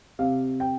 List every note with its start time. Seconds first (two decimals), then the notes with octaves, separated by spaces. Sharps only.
0.19 C3 F5
0.60 G5